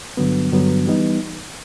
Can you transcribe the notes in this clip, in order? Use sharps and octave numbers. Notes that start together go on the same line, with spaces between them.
G2 D3 F#3 B3
G2 D3 F#3 B3
E3 G3 B3 D#4